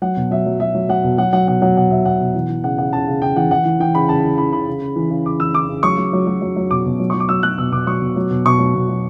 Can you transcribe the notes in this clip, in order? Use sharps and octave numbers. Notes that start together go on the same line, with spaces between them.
F#3 F#5
B2
F#3 E5
F#3
F#3 E5
F#3
F#3 F#5
B2
F#3 F#5
F#3 F#5
B2 F#5
F#3 F#5
B2 F#5
B2 E5
B2 F#5
B2
E3
E3
C#3 F#5
C#3 F#5
C#3 A5
C#3
C#3 G5
E3 F#5
E3 F#5
E3
E3 G5
C#3 B5
C#3 A5
E3
E3 B5
C#3 B5
C#3
C#3
E3
C#3
C#3 D6
E3 E6
E3 D6
C#3
F#3 C#6
F#3
F#3
F#3
F#3
F#3
B2 D6
B2
F#3
C#6
F#3
D6
F#3 E6
F#3 F#6
B2 E6
B2 D6
F#3 C#6
B2
F#3
B2
B2 C#6
F#3
B2
F#3